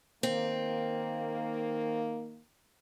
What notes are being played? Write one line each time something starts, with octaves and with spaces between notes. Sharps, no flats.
D#3 A#3 C4